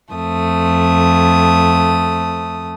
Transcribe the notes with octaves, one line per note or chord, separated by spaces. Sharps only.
F2 A3 D#6